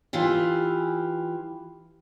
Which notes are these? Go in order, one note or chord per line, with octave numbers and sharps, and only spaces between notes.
E3 E4 F4 G4